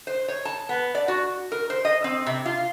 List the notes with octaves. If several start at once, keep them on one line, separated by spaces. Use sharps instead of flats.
C5
C#5
A5
B3
D5
F#4
A#4
C5
D#5
C4
C3
F4